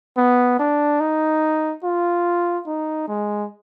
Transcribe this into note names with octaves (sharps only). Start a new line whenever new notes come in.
B3
D4
D#4
F4
D#4
G#3